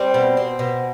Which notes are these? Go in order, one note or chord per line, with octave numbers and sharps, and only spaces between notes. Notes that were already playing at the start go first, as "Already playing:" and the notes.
Already playing: G3 C4
B2
C4
B2